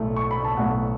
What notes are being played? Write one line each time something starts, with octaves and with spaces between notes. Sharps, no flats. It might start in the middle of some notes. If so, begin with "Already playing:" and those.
Already playing: B1 A2 A3
C#6
B5
A5
B1 A2 A3 F#5